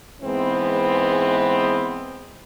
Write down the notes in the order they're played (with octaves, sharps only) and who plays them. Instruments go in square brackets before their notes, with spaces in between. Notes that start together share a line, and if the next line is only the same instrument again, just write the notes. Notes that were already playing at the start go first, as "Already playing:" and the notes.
[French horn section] G#2 E3 G#3 B3 C4